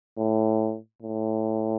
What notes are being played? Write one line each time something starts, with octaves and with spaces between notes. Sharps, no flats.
A2
A2